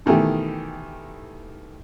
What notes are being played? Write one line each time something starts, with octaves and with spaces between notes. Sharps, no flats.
B2 D#3 E3 A3 G4